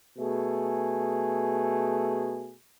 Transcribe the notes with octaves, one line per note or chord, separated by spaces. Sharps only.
B2 A3 G#4